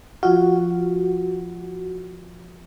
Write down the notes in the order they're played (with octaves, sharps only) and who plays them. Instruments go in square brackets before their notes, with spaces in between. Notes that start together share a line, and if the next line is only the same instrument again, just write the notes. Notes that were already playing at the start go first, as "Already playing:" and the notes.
[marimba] F3 F4 [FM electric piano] F#4